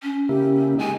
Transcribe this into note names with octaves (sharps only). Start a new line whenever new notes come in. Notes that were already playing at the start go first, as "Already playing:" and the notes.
C#4
C#3 A#3 E4 G4
G#3 D#4 G#5